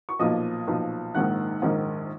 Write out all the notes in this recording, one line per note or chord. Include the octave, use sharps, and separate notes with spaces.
C#6
B1 A#2 F3 D#5 D#6
B1 A#2 F3
A#1 G#2 D#3 A#3 D#4 F#5 F#6
A#1 G#2 D#3 A#3 D#4